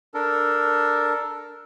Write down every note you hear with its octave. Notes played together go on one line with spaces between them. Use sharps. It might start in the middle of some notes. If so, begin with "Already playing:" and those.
D4 A4 A#4